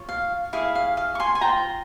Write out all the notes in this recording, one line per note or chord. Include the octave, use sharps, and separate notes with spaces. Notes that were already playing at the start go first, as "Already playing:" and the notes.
Already playing: F4 C#5
F5
E4 G#4 C#5 F5
F5
F5
C#6
G#5 C6
G#5
F4 C5 G5 A#5